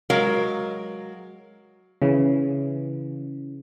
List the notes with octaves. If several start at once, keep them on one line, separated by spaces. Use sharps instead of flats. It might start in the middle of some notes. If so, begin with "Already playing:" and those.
F#3 G#3 A#4 F5
C#3 E3